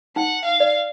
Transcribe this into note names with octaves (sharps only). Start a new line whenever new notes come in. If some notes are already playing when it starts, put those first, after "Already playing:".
D#4 F#5
F5
D5